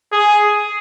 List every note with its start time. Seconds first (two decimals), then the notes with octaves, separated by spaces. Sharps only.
0.12 G#4